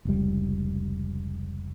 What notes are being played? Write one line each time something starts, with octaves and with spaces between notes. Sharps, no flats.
F1 C#2 G3